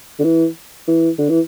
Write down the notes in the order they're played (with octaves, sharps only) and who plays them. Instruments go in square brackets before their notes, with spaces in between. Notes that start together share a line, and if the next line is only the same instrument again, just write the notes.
[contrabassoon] D3
E3
E3
D3
E3